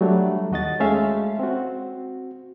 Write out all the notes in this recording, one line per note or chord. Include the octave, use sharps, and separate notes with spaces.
F#3 G3 A3 D4
D#2 F#4 D#5 A6
G#3 A3 C#4 E5 F5
C4 F#4